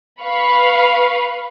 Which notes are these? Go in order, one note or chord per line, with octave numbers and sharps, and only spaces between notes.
B4 F5 B5 C#6